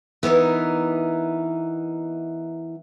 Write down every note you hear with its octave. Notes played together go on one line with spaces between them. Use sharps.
E3 B3 D#4 A#4